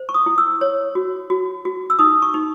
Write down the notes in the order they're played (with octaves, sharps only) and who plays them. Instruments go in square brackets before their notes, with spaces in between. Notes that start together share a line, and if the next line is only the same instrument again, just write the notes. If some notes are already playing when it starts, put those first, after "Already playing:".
Already playing: [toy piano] C5
C#6
D#6
E4
E6
C#5
F#4
F#4
F#4
E6
D#4 D#6
C#6
D#4